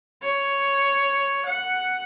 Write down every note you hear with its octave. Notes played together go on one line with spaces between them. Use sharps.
C#5
F#5